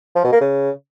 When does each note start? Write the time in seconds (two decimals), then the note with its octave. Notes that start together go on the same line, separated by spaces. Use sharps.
0.15 F3
0.24 B2
0.32 A#3
0.41 C#3